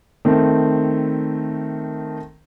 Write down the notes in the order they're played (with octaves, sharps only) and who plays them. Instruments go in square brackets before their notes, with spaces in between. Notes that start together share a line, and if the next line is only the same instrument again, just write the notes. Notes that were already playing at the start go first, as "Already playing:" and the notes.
[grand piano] D#3 A3 C4